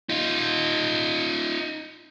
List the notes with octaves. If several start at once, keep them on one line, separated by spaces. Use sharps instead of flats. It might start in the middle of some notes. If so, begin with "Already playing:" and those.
D#4 F4